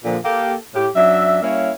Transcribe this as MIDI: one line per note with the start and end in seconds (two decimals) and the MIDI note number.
0.05 0.17 46
0.05 0.17 50
0.05 0.17 53
0.24 0.54 58
0.24 0.54 67
0.24 0.54 69
0.75 0.87 45
0.75 0.87 67
0.95 1.42 42
0.95 1.42 54
0.95 1.42 62
0.95 1.42 76
1.42 1.71 55
1.42 1.71 58
1.42 1.71 61
1.42 1.71 64
1.42 1.71 73
1.42 1.71 77